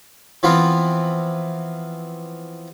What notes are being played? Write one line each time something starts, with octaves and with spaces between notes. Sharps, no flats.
E3 F3 B3 C4 F4